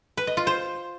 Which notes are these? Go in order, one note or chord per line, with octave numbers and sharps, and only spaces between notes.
B4
D#5
F4
C5